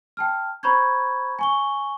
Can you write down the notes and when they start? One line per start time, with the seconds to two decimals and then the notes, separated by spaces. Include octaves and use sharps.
0.17 G5 A5 F6
0.63 C5 A#5 B5 C#6 G6 G#6
1.39 G#5 C#6 G7